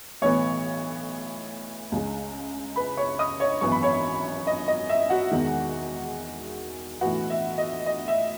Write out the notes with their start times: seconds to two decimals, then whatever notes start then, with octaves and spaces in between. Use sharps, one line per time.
0.22 B1 A2 E3 B3 C#5 C#6
1.92 C#2 C#3 G#3
2.76 B4 B5
2.97 C#5 C#6
3.19 D#5 D#6
3.40 C#5 C#6
3.61 G#1 F#2 E3 B3 C#6
3.72 B5
3.83 C#5 C#6
4.47 D#5
4.68 D#5
4.90 E5
5.10 F#4 F#5
5.31 E1 E2 D#3 G#3
7.01 B1 A2 E3 B3 F#4 F#5
7.30 E5
7.58 D#5
7.86 D#5
8.08 E5